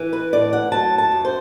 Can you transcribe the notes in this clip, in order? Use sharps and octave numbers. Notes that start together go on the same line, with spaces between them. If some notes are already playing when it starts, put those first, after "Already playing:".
Already playing: E3
B4
A2 D5
F#5
F#3 A5
A5
F#2
C5